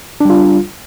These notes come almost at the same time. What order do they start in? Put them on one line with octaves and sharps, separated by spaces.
D4 G3 F4